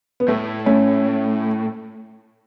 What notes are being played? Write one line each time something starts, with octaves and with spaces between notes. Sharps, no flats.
B3
A2 A3
A3 C#4